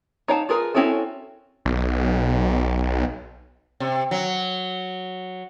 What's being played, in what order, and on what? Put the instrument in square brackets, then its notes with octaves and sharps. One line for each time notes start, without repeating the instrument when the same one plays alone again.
[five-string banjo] D#4 C#5 F5 G5 A5
F4 G#4 A#4 B4
C4 C#4 E4 F#4 A4
[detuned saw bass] B1
[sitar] C3
F#3